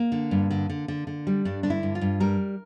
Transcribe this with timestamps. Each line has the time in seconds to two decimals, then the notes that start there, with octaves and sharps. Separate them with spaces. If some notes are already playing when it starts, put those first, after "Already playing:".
Already playing: A#3
0.12 D3
0.31 G2
0.50 D3
0.70 D3
0.88 D3
1.07 D3
1.27 G3
1.45 G2 D4
1.63 D3 D4
1.70 E4
1.83 G2
1.95 F4
2.01 G2
2.20 G3 A#4